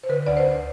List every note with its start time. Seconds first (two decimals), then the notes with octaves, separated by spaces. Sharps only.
0.03 C5
0.09 D3 B4
0.26 D2 D5
0.37 C5
0.46 D2